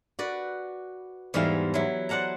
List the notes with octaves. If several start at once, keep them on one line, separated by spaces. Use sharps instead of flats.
F#4 B4 D5
E2 G#2 G3 G#3 E4 F5
F#3 E4
C5 D5 F#5 A5 A#5